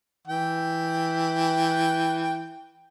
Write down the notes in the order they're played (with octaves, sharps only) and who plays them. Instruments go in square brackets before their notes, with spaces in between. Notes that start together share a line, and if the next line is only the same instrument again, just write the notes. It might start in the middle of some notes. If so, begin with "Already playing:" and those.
[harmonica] E3 G5